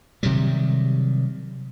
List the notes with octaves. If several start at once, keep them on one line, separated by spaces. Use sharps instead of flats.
C3 D#3 F#3 G3